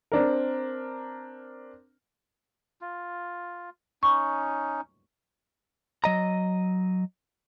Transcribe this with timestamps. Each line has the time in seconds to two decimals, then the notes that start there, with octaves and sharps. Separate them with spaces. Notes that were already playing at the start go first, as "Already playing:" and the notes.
0.12 C4 D4 A#4
2.81 F4
4.03 C#4 D#4 C#6
6.04 F#3 D#5 A#5